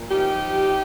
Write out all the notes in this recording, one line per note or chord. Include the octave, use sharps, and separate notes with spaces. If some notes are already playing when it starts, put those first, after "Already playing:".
Already playing: A#2
F3 D#4 G4
F3